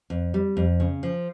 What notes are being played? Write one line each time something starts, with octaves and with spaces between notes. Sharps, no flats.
F2
G3
F2
C#3
F3